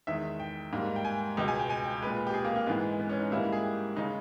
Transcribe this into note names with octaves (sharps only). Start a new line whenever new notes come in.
E2 D#3 G#3 E5
G5
G#2 G3 A#3
G5
G#5
C#2 B2 G#3 G5
G#5
G5
G#5
G5
A#2 G#3 B4
G4
G#4
A#3
A#3
G#2 E3 G#3 B3
B3
C#4
D#4
G#2 G3 A#3 E4
G#4
G4
C#3 G#3 D#4